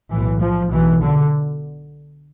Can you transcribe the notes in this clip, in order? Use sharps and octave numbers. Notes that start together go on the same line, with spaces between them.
B1 A2 E3
F3
B1 B2 E3
D3